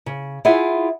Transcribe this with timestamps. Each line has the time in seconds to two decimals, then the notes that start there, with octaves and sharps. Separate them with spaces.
0.06 C#3
0.45 E4 F4 G#4 E5 F#5 G#5